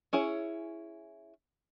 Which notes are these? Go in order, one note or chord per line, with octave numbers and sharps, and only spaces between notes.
C#4 E4 G#4 C#5